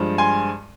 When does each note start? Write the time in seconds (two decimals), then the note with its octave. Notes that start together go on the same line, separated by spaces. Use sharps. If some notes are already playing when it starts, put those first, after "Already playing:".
Already playing: G2 F3 G#3
0.18 G#5 C6